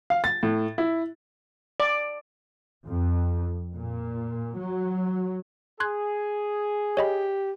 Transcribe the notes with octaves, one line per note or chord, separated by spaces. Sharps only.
F5
A6
A2
E4
D5
F2
A#2
F#3
G#4 C6 F#6 G#6
G4 C#5 D#5 B5